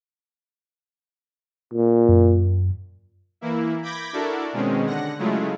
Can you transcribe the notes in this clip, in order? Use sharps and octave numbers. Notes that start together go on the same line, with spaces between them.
A#2
F#2
E3 A#3 E4
B5 D6 G6 G#6 A#6 B6
D4 E4 F#4 A4 A#4 D5
B2 D#3 G#3 C4 C#4
D3 F#5 A#6
C#3 F#3 G#3 A3 E4 F4